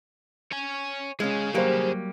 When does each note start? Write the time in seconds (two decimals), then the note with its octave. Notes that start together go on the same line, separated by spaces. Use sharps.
0.52 C#5 G#5
1.20 G#3 C#4 G#4 F5
1.54 F#3 G3 A#3 G4 C5